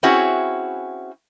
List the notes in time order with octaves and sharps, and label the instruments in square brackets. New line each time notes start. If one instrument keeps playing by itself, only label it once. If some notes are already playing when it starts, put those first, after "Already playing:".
[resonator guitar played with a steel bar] C4 C#4 E4 F#4 G#4